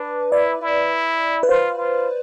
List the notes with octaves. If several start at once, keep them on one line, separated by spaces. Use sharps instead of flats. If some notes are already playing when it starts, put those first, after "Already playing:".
Already playing: D4 B4
E4 D5
E4
B4
F4 C5
F4